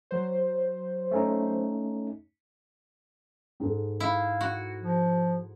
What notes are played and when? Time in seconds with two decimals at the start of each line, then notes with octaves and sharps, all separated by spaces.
0.11 F#3 C5
1.11 A3 C#4 D#4
3.60 G#2 G#4 A4
4.00 E4 F5
4.41 F#4
4.80 F3